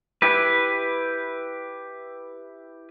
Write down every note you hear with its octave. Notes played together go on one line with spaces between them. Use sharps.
E4 G4 B4